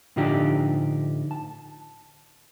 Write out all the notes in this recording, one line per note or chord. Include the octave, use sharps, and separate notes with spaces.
A2 D3 F3 D#4 G4
A5